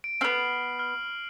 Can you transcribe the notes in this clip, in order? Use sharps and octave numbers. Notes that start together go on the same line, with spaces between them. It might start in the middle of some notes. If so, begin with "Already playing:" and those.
D7
B3 C4 F6 C7 F#7
F6